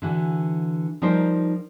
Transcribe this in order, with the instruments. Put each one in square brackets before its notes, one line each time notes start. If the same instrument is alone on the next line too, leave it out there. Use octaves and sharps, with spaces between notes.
[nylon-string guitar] D3 E3 F#4
F3 G3 D#4 A#4 C5